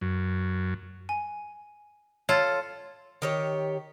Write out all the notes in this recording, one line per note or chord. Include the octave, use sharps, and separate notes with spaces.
F#2
G#5
F4 A4 C#5
D#3 G4 C#5